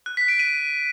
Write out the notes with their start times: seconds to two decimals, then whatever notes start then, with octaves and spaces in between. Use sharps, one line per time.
0.06 F#6
0.17 B6
0.28 D7
0.39 D#7